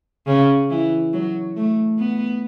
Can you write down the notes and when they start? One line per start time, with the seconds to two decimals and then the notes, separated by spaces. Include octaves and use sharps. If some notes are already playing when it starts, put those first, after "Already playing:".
0.27 C#3
0.70 E3
1.13 F#3
1.56 A3
1.99 B3